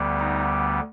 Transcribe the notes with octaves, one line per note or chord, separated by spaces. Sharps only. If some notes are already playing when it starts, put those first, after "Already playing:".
Already playing: D2 D3 G3 B3
D#4